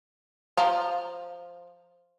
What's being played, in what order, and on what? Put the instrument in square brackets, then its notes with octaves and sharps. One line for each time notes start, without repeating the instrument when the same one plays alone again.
[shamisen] F3 F5 A#5